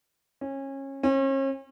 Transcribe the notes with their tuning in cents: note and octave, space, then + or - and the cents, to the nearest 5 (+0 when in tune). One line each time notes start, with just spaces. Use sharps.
C#4 -25
C#4 -40